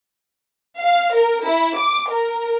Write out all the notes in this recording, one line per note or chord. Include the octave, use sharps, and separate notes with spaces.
F5
A#4
E4
D6
A#4